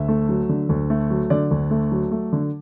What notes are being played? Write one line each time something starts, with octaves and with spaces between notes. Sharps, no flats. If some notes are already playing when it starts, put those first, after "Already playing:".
Already playing: D2 E5
A3
F#3
D3
D2
A3
F#3
D3 D5
D2
A3
F#3
A3
D3